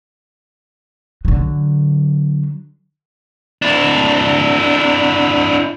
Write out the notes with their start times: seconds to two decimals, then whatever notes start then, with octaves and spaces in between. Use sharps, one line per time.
1.25 D3 F#3
3.62 D4 E4